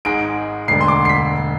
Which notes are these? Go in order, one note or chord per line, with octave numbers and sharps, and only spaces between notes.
G#1 G#2 G#3 D7
E1 D2 D3 C7
C6
D6
C7
B6